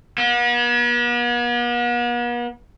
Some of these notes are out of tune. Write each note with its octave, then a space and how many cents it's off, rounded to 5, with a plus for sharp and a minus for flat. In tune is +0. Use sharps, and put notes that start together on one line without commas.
B3 -45